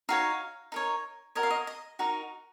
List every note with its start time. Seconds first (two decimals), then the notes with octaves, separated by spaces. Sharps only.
0.09 D#4 F#4 C#5 F5
0.72 D#4 A#4 C#5
1.35 F#4 A#4 C#5 D#5
1.43 F5
1.50 D#5
1.67 D#5
1.99 D#4 F#4 A#4